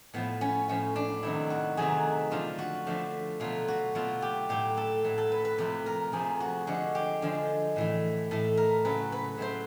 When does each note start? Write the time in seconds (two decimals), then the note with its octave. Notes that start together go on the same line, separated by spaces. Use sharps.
0.14 A2 F3 A3 B3
0.41 C#4
0.69 A2 F3 A3 C#4
0.96 D4
1.23 C3 D#3 F#3 A3 E4
1.50 F#4
1.77 C3 D#3 F#3 A3 G#4
2.31 D3 F3 A3 F4
2.59 F#4
2.87 D3 F3 A3
3.40 B2 F#3 A3 F4
3.68 F#4
3.95 B2 F#3 A3 F4
4.22 G4
4.49 A2 F#3 A3 G4
4.77 A4
5.04 A2 F#3 A3
5.18 A4
5.32 B4
5.45 B4
5.58 C3 F3 A3 B4
5.86 A#4
6.12 C3 F3 A3 G#4
6.40 F#4
6.67 D3 F3 G#3 F#4
6.95 G4
7.22 D3 F3 G#3
7.76 A2 E3 A3
8.31 A2 E3 A3 A4
8.57 A#4
8.85 C#3 F#3 A3 B4
9.12 B4
9.37 C#3 F#3 A3 C5